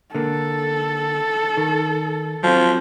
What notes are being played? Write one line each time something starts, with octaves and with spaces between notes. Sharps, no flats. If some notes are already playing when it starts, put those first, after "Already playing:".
D3 A#3 A4
D#3
F3 F#3 C4